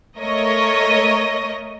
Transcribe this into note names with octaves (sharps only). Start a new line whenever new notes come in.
A3 A#4 C#5 D#5